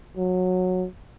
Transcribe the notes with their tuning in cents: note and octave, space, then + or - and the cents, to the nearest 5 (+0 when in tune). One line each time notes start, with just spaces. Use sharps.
F#3 -15